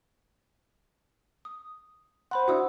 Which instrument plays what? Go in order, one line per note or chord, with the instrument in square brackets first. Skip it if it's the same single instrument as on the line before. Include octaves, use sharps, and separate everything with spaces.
[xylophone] D#6
[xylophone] C5 B5 C6 [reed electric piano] F#5
[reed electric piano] D4 E4 F#4 [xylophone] F#5 D#6 E6